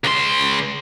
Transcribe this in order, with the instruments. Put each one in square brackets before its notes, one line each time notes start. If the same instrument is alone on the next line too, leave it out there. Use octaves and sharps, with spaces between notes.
[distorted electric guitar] C#2 C6